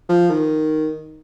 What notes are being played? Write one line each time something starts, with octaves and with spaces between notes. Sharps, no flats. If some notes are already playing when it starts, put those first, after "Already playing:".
F3
D#3